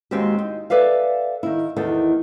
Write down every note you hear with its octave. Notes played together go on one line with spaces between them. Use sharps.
D#2 G#3 C4 F#4 G4
D#4
A4 B4 D5 E5 F5
D#3 E4
E2 D#3 A3